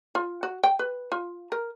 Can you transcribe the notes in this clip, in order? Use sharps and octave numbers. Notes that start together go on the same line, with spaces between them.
F4
F#4
G5
B4
F4
A#4